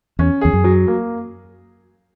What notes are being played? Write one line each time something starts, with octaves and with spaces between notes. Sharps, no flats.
E2 C#4
E2 G#4
F#2
F#3
A#3